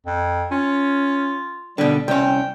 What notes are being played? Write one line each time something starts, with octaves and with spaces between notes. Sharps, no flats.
F2
C#4 F4
B2 D3 G3
C2 C4 C#4 G5